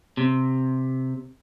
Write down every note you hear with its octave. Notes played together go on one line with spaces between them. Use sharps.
C3